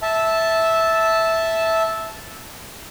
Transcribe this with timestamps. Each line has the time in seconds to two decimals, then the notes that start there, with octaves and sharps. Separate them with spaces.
0.02 E5 A5